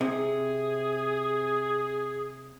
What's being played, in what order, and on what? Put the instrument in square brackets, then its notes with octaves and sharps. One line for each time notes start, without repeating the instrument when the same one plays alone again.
[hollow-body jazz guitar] C3 [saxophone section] G#4